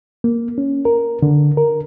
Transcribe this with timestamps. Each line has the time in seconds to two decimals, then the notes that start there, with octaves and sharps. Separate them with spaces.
0.24 A#3
0.58 C#4
0.85 A#4
1.22 D3
1.57 A#4